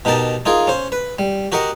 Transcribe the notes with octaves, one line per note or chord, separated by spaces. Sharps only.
B2 D#4 G4 A#4 A5
D#4 F4 G#4 A#4
C#4 C5
B4
G3
F#4 G4 A#4 D#5 F#5